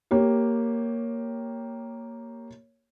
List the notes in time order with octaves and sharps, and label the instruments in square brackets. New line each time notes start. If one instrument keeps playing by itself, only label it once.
[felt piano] A#3 G4 C#5